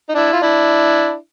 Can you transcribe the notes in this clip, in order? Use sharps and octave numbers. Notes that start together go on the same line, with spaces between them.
D#4
D4 E4
F4
D4 E4